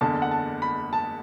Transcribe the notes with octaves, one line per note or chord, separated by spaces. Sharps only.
F#1 E2 D3 A5
F#5
A5
B5
A5